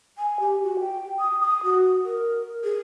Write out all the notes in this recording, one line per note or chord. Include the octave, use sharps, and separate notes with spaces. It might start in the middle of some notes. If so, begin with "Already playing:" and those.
G#5
G4
F#4
G5
D#6
D#6
F#4
A#4
G#4